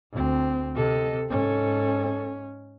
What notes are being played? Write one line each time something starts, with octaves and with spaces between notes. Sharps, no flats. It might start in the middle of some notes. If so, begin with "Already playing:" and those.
D2 C4
C3 A4 D#5
G#2 C#4 A4